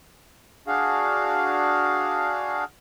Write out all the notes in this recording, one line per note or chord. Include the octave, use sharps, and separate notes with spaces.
D4 F#4 G#4 F5